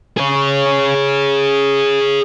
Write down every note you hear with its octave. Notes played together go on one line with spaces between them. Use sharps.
G#4 C#5